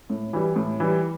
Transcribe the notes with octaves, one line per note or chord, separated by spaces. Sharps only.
A2
E3 G3
A2
E3 G3